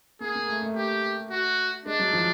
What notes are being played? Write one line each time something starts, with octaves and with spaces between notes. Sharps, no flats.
A#3 G#4
A#3
A3
A3
G4
F#4
G#3 D4
F#3
F3